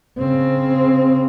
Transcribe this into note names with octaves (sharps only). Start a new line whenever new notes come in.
C#3 C4